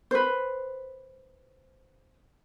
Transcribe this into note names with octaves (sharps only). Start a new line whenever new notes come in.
B4 C5